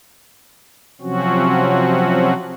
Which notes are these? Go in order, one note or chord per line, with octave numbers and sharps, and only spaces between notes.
C3 F3 F#3 C4 C#4 F#4